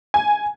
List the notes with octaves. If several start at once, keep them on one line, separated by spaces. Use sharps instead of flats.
G#5